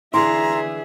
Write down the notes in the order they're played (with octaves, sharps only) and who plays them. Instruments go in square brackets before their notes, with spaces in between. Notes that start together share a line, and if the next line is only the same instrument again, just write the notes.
[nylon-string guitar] D3 E3 E4 [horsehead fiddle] G#4 E5 [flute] A#5 [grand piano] C6